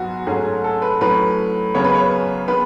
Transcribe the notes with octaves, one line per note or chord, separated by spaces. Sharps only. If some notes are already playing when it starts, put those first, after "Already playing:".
Already playing: G#2 F#3 B3 F#4 G#4
G#2 F#3 A3 C#4 G#4
A4
B4
A2 F#3 A3 C#4 B4
F#2 C#3 G#3 B3 C#5
B4
C#5
D#3 G#3 B3 B4